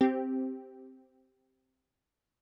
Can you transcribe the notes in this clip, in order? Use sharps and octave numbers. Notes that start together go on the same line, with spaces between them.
C4 G4